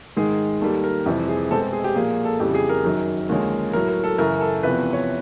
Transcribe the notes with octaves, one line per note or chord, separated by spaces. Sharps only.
G#2 D#3 G#3 G#4
D#2 D#3 G3 A4
A#4
F2 C3 E3 G3 C4 G4
G#4
B2 G#3 C4 A4
A4
G#4
G4
A#2 F3 A#3 G#4
A4
F2 C#3 E3 G3 G4
G#4
A#4
F#2 D#3 F#3
D#2 D3 F3 G#3 C#4
A2 F#3 A3 A#4
A#4
A4
F#2 C#3 E3 A#4
A4
E2 C3 F3 B4
C#5